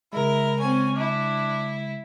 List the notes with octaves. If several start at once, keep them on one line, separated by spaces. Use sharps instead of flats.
C#3 G#3 E4 A#4
C4 C#4 G#5
D4 E4